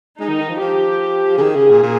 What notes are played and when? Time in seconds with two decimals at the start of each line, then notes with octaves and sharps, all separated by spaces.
0.20 G#3 D#4
0.29 D#3
0.40 D#3
0.49 F3
0.60 F3 G4
1.38 C#3
1.42 D#3 G#4
1.56 C#3
1.70 A#2
1.83 A#2